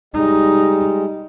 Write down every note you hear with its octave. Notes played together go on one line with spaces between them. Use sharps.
G3 G#3 D#4